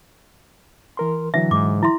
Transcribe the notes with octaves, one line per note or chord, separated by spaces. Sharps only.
E3 A#4 C6
D3 E3 F#3 E5
G#2 D6
E4 E5 C6